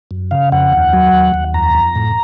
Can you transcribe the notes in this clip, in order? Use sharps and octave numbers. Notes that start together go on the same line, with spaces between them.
F#2
C#3 F5
F2 F#5
D#2
F#3
D#2
D#2
F2 A#5
F2
A2